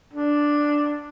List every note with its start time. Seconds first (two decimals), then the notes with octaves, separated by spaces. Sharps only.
0.14 D4